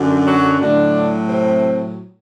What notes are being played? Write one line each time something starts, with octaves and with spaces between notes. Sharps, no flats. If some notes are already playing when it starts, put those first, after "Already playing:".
Already playing: F#2 D3
F#3 F#4
A2 D3 F#3 D4
C3 C4